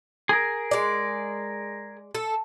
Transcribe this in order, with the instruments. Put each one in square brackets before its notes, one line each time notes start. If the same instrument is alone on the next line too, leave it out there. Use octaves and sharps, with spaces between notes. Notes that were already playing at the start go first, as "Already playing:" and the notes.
[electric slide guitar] G#4 A#4
[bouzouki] G#3 D5
A4